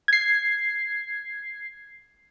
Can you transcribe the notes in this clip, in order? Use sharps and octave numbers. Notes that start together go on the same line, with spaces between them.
G#6 C7